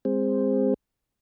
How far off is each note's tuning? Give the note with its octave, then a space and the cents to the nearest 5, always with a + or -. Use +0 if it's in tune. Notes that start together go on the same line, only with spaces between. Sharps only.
G#3 -30 C4 +0